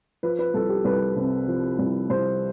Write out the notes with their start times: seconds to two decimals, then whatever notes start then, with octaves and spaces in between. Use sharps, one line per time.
0.23 F3 B4
0.39 B4
0.54 C2 A4
0.69 G4
0.85 C2 B4
1.16 C3
1.48 F3
1.79 C2
2.09 C2 C5